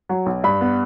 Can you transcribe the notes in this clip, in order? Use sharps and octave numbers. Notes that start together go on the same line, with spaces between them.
F#3
B1
G2 B5
B3